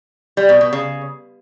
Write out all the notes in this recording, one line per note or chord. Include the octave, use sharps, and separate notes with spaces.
G3
B2
B2
C#3